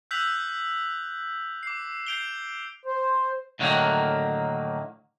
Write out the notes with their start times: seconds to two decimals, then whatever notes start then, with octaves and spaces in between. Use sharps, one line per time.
0.11 E6 F#6 G6 B6 F7 F#7
1.63 D6 C7
2.07 G6 C7 D7 F7 G7
2.85 C5
3.59 A2 D3 D#3 F#3 A#3